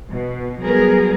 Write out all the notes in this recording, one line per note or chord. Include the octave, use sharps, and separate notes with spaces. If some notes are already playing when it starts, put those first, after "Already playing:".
B2
F#3 G3 B3 G#4 A#4